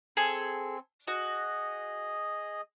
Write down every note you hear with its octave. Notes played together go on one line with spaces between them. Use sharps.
C4 G#4 A4
F#4 G#4 D#5